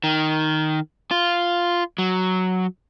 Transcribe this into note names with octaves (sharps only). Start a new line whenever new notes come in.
D#3
F4
F#3